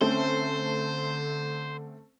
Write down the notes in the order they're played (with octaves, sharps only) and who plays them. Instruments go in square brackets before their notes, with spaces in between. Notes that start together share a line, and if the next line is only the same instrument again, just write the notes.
[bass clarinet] D3 [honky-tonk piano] A3 [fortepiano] C4 C#4 [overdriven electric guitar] C5